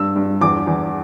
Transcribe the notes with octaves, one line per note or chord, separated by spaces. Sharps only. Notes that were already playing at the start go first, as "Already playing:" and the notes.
Already playing: G2 E6
G2
E2 D6
E2